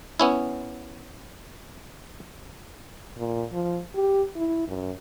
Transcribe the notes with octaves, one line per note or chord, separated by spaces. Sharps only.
B3 C#4 E4
A#2
F3
G4
E4
F#2